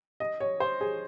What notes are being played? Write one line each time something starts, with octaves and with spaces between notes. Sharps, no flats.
D#5
C#5
C5
G#4